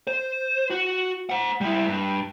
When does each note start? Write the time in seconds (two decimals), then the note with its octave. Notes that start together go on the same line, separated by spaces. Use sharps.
0.07 C5
0.70 F#4
1.29 C5 F#5
1.61 G3 E4
1.87 G2